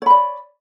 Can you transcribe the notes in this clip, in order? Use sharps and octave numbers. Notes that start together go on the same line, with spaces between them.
C#5 D5 B5